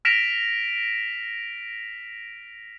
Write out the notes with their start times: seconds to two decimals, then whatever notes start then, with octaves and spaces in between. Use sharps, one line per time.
0.05 F6 A#6 B6 D7 E7 F7